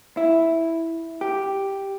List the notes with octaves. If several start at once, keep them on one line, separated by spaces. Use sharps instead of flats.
E4
G4